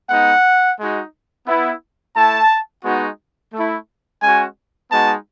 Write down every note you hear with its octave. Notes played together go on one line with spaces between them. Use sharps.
G#3 B3 D#4 F#5
G#3 D#4 F#4
B3 E4
A3 E4 A5
G#3 B3 D#4 F#4
A3 E4
G#3 C#4 F#4 G#5
G#3 B3 D#4 F#4 A5